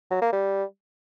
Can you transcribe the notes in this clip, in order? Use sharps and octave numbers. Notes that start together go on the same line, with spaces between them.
F#3
A#3
G3